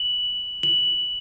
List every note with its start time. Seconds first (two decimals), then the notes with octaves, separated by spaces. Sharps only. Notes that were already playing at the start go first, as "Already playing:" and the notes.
Already playing: F#7
0.63 F#7